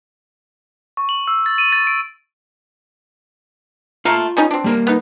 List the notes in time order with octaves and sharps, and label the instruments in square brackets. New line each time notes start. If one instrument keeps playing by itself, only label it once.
[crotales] C#6
F#7
E6
A6
D#7
A6
D7
[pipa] A3 F5 [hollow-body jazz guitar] F4 A#5
[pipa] G3 C#4 D#4
C4 D4
[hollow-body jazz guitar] G3 A#3 A#4
[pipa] B3 D#4